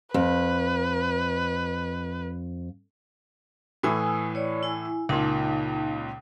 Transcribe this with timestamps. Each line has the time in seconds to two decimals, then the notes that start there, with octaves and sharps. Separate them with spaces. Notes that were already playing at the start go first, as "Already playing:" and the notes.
0.14 F2 B4
3.83 A2 E3 G#5 D#6 E6
4.35 C#5 D5
4.63 E4 G#5
5.09 C#2 A#2 D#4 A5